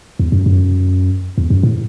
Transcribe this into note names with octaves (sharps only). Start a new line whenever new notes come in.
E2
F#2
F#2
E2
F#2
A2